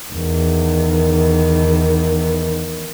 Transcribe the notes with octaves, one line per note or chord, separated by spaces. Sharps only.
E2 D#3